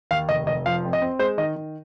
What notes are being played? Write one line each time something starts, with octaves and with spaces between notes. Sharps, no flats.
D#2 F5
F1 D#5
F1 D#5
F3 F5
F2
D#5
C4
G#3 C5
D#3 D#5
D#3